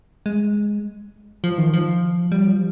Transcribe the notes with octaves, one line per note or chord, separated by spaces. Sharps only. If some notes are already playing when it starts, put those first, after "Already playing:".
G#3
F3
D#3
F3
G3
F3